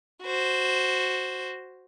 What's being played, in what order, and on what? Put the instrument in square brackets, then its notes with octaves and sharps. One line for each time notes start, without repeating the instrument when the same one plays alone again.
[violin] F#4 C5